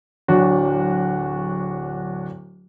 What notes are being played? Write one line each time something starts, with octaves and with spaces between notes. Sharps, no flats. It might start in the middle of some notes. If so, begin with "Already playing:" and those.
D1 F#3 D4 F#4